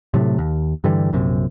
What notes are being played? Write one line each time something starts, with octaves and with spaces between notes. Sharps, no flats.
A2 C3 F#3 A3
D#2
G2 D3 E3 G3
A#1 F#2 C3